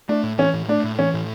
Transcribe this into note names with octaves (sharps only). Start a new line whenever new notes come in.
A3 D4
A2
E3 C#4
A2
A3 D4
A2
E3 C#4
A2